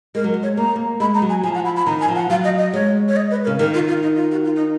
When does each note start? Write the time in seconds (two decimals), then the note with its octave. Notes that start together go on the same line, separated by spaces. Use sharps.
0.15 G#3 A#4
0.24 F#3
0.34 G#3
0.43 C#5
0.57 A#3 A#5
0.76 A#3
1.00 G#3 B5
1.15 A#5
1.22 F#3
1.29 G#5
1.43 F3 G#5
1.54 F#5
1.65 B5
1.76 B5
1.86 D#3 A#5
2.01 G#5
2.08 F3
2.15 F#5
2.30 F#3 F5
2.44 D#5
2.58 D#5
2.73 G#3 C#5
3.09 C#5
3.16 D#5
3.31 B4
3.45 C#3 A#4
3.59 D#3 A#4
3.74 F4
3.88 F4
4.02 D#4
4.16 F4
4.31 F#4
4.45 F4
4.56 D#4